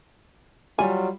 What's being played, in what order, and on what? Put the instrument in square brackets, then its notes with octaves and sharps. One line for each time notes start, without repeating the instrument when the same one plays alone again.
[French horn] F#3 [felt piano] G3 F4 [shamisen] G#5